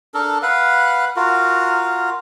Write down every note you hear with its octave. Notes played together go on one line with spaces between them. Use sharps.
D4 A4 A#4
B4 F5 F#5
F4 F#4 A#4